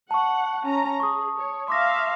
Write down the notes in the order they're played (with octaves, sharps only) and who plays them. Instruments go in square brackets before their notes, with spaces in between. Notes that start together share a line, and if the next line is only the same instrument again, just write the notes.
[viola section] F#5 [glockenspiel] A5 C#6
[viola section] C#4 A#5
[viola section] G#4 [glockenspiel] C#6 D#6
[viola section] C#5
[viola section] E5 F5 [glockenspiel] C6 D6 A#6